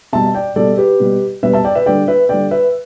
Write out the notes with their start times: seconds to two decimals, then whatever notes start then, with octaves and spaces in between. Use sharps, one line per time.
0.13 B2 G3 E5 A5
0.35 D5 G5
0.56 B2 G3 A4 D5
0.78 G4 B4
1.00 B2 G3
1.43 B2 G3 B4 E5
1.53 E5 A5
1.65 D5 G5
1.75 B4 E5
1.86 D3 G3 D5 G5
2.08 B4 E5
2.29 D3 G3 D5 G5
2.51 B4 E5